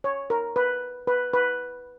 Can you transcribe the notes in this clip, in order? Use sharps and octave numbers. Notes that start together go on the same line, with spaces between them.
C#5
A#4
B4
B4
B4